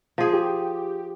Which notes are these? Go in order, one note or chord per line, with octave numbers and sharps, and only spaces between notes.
F3 G#4
G4